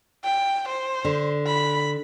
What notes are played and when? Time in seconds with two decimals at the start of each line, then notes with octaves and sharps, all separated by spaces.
0.24 G5
0.68 C5
1.05 D3
1.47 B5